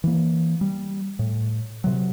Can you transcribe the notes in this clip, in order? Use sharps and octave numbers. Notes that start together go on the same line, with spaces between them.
E3 A#3
G3
A2
C3 F#3